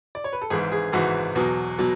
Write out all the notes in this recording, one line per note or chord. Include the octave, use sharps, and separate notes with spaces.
D5
C#5
B4
A4
G#1 G#2 E3 G#4
G#4
G#1 G#2 E3 F#4
E2 B2 F#3
B2 F#3